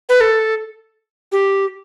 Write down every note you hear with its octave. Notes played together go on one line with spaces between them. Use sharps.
B4
A4
G4